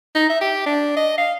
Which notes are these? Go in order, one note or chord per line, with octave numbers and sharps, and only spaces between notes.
D#4
E5
G4
D4
D#5
F5